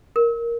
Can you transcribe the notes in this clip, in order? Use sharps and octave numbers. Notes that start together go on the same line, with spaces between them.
A#4